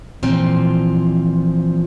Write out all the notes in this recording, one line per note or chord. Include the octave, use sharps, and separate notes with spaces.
A#2 E3 F3 C4 F4